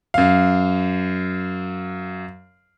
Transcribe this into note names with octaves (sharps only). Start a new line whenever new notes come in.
F#2 F5